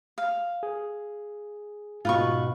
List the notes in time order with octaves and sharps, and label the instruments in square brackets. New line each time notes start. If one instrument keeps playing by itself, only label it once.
[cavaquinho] F5
[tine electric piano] G#4
[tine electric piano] G#2 B2 [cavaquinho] F4 B4 C#6